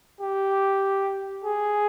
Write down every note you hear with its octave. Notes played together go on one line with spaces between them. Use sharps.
G4
G#4